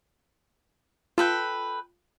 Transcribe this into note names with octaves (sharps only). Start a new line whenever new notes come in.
F4 A4 B4 G5